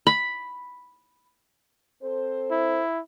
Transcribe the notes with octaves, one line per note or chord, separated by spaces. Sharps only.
B5
C4 A4 C5
E4